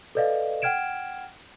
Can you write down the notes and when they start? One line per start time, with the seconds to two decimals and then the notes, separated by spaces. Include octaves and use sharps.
0.15 A4 B4 D5 D#5 F5
0.62 F#5 G5 F6 G#6 D7 E7